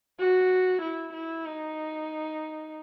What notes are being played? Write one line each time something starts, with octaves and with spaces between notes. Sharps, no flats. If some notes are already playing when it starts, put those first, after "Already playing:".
F#4
E4
E4
D#4